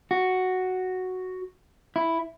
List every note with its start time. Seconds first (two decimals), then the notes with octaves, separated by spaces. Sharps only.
0.11 F#4
1.96 E4